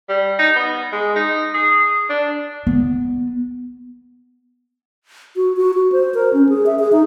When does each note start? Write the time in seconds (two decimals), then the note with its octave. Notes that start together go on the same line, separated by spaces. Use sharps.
0.09 G3
0.39 D#4
0.56 B3
0.93 G#3
1.16 D#4
1.54 G#4
2.09 D4
2.67 B3
5.36 F#4
5.57 F#4
5.74 F#4
5.92 C5
6.14 A#4
6.33 C#4
6.49 G#4
6.66 E5
6.79 G#4
6.92 D#4